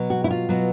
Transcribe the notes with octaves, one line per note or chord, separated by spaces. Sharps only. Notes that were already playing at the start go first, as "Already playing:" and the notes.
Already playing: B2 F#3
F#4
E4
F4
B2 F#3